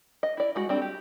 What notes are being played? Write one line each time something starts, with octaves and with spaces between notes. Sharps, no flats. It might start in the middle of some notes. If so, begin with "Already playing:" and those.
D#5
E4 D5
G3 G#3 F#4
G3 C4 D4 A4
G4